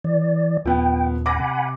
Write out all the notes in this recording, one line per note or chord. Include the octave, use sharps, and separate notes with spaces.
E3 D5
D#1 F3 B3 G5
F#5 G#5 B5 D6 A#6
C3